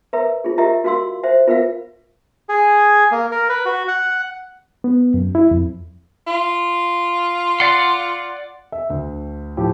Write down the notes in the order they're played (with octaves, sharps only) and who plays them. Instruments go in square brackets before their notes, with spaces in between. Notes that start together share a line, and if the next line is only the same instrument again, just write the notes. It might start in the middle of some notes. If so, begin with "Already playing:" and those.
[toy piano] A#4 B4 E5 A#5
F4 G#4
F4 G4 A#4 D#5 E5 A#5
F#4 A#4 F5 C6 E6
C5 E5 F#5
F4 A#4 B4 E5 F5
[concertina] G#4
A#3
A#4
B4
F#4
F#5
[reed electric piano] B3
F#2
E4
F2
[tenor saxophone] F4
[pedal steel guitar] D5 F#5 C6
[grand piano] E5
D2
A2 F3 G4